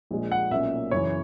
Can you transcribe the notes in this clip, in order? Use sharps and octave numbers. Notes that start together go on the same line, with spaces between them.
A#1 A#2 G#3
F#5
B1 A#2 A#3 C#4 E5
F#1 F#2 E3 C#5